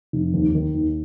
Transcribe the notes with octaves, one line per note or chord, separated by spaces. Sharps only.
F1
D#2
D#3
D#2